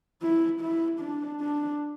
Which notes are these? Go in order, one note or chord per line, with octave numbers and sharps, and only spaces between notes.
E4
E4
D4
D4